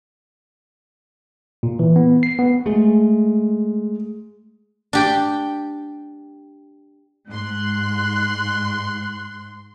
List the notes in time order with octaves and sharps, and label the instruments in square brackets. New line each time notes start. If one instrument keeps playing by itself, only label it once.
[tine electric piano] A#2
E3
B3
C7
B3
[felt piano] G#3 [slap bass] A3
[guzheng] D4 G4 G5
[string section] G#2 C6 [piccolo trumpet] F#6